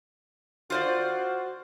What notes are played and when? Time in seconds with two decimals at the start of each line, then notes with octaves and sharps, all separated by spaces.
0.70 F4 F#4 C5 D5